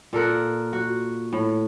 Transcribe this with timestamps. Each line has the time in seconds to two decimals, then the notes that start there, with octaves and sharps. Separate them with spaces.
0.13 A#2 A4 A#4 F#5
0.73 F#4
1.33 A2